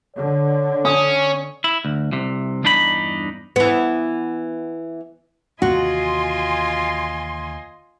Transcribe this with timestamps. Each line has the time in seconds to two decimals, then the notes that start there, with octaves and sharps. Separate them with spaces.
0.17 D3 C#5
0.85 C#4 D#6
1.64 E4
1.85 D2
2.12 C2 C3
2.63 E2 G2 D4 D#4 C5 B5
3.56 E3 B3
5.62 D#2 C3 E3 F4 F#4 D#5 G#5 C6